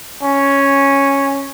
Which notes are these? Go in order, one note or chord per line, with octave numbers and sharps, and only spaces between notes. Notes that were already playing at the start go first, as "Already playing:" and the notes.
C#4